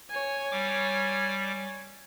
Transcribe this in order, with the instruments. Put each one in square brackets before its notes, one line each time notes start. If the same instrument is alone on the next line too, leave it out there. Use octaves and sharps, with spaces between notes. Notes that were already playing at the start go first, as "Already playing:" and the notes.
[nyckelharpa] C#5 G#5
[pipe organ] G3 D6